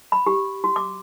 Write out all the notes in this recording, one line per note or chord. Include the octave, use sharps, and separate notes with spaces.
B5
G4
F#4
D6